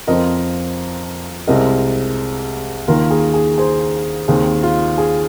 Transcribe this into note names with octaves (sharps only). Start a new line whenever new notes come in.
F2 F3 C4 A#4 D#5
C2 C3 G#3 C4 A#4 D#5
D#2 D#3 A#3 F4 A#4
G#4
G#4
G#4 C5
D#2 D#3 C4 G#4
F4
G#4